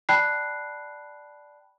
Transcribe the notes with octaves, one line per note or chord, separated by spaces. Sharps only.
D5 G5 A5 B5 F#6 C7